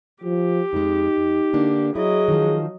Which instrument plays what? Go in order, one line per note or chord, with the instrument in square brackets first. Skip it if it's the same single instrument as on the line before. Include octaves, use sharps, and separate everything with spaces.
[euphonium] F3 [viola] G4
[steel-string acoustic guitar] F2 G#3 [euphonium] D#4
[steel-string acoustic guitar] F2
D3 A#3 D4
[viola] F#3 D#5 [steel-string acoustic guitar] E4 [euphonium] G#4
[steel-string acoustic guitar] D#3 F3